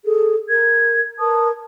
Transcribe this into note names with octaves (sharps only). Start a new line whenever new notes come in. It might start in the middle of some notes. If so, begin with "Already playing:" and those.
G#4 A4
A#4 G#6
A#4 B4 A5 D#6